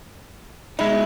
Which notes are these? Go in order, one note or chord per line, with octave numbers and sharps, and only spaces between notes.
B2 G#3 D#4 E4